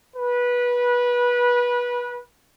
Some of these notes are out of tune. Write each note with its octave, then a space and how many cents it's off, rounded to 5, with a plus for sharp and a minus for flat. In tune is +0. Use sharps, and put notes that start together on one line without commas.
B4 -20